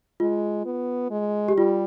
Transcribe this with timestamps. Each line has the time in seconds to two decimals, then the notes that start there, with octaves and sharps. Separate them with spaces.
0.20 G#3 F4
0.66 B3
1.11 G#3
1.48 G4
1.56 G3 F4